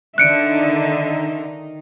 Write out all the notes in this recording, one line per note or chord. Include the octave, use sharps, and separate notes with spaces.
D3 D#3 D#4 E5 F#6 C#7 D7